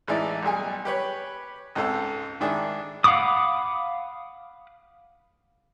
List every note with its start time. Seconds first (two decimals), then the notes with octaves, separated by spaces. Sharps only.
0.08 A1 E3 G#3 D#4 E4 D5
0.43 B1 G3 G#4 G#5
0.85 G4 B4 C#5
1.75 C#2 G#2 C4 A4 C5 F5
2.40 G#2 D#3 D4 E4 G#4
3.04 F5 F#5 B5 D6 D#6